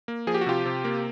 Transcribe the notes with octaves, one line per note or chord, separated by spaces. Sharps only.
A#3
F3 G#4
G4
F#4
C3 F4 G4
C3
A#3